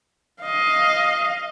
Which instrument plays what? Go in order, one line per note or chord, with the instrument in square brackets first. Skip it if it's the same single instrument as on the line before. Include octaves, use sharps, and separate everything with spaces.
[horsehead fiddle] D#5 F5